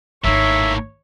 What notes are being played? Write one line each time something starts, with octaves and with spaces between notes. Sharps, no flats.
G#1 A2 A#3 D#4 C#5 E5